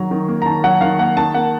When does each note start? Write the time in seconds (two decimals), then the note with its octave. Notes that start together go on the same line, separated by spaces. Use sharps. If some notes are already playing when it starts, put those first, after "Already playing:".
Already playing: D#3 F#3 A#5
0.11 D#3
0.29 A#3
0.42 A#5
0.46 D#3 A5
0.64 F#3 F#5
0.81 D#3 F5
0.99 A#3 F#5
1.17 D#3 A5
1.34 A#3 F#5